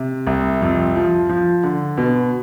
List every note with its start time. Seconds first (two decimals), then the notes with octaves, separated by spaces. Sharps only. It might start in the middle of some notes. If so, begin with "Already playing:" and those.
Already playing: C3
0.27 C2
0.62 F2
0.96 F3
1.29 F3
1.63 D3
1.98 B2